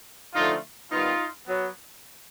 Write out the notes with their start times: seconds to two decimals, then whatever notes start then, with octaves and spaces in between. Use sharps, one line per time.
0.35 D3 F3 A3 D#4 F4
0.92 D#3 G3 B3 D#4 F4
1.48 F#3 B3